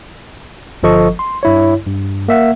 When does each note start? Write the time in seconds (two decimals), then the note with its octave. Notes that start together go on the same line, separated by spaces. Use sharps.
0.83 G1 F3 A4 D#5 C#6
1.19 C6
1.43 G2 E4 C#5
1.87 G2
2.28 A#3 E5 F#5